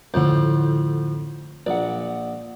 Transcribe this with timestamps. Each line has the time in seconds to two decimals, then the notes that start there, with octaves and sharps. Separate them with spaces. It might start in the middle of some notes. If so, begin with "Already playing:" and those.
0.14 F2 A2 D3 G6
1.67 A#1 D5 F#5